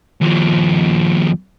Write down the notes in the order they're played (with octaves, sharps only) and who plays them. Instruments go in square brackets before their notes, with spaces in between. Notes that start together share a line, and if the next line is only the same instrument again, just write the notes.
[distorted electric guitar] D#2 F3